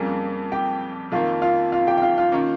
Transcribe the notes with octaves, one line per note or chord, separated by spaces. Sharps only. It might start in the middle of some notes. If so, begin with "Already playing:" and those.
Already playing: F2 C#3 G3 A#3 G#5
G4 G5
F2 D#3 A#3 F4 F5
F4 F5
F4 F5
G4 G5
G5
F4 F5
F4 F5
D#3 A#3 C#4